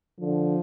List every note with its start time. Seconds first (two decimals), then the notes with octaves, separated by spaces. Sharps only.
0.20 D3 F3